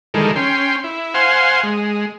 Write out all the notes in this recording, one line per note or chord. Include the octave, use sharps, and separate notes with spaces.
D#3 E3 G3 G#3 A4 A#4
C#4 G5 C6
E4
C5 F5 F#5 G#5 C6
G#3